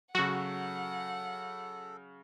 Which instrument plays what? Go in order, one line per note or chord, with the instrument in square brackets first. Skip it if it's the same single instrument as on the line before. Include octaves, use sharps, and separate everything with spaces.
[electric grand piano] C#3 F#3 [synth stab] F#4 [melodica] A4 [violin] F#5